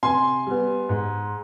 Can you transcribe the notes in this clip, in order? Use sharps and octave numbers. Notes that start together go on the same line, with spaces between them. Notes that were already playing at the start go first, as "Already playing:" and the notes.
C3 G#5 C6
G3 B3
G#2